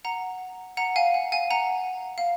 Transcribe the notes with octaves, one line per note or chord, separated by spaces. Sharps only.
F#5 A#5
F#5 A#5
F5 G#5
F#5
F5 G#5
F#5 A#5
F5